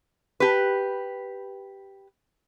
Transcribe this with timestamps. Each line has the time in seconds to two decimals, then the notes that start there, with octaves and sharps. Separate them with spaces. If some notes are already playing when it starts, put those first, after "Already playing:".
0.40 G4 B4